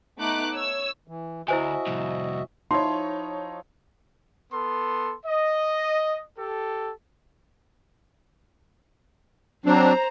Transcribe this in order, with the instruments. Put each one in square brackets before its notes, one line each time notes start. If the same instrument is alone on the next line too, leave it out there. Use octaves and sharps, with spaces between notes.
[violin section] A3 B3 D#4 D6 F#6
C#5 E6
[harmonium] E3
[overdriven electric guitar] D2 [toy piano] E4 C5 G#5 [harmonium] F#4 D#5 E5
[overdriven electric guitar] C2 F2
[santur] F3 E4 [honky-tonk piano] D#4 C#5 [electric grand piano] C6
[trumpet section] B3 A4 C6
D#5
G4 A4
[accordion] F#3 C4 D4 [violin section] C5 A#5